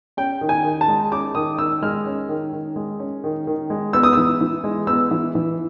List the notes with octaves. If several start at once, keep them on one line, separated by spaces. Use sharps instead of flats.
C#4 G5
D#3
G#5
D#3
A5
G#3
C#4 D6
D#3 D#6
D#3 E6
G#3 F6
C#4
D#3
D#3
G#3
C#4
D#3
D#3
G#3
B3 E6
D#6
E3 E6
E3
G#3
B3 E6
E3
E3